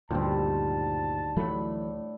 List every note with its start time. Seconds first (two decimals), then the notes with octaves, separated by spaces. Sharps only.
0.11 D2 G2 A#2 D#3 G3 C4 A5
1.37 A2 E3 F#3 A3 D4 B5